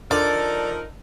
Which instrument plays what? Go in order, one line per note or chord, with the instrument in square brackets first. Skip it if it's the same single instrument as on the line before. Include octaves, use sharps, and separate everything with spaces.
[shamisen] D3 [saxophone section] F3 D#4 A#4 [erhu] A4 [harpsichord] D5